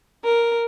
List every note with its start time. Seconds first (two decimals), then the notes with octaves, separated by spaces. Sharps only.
0.24 A#4